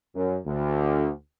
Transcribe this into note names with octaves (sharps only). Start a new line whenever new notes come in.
F#2
D2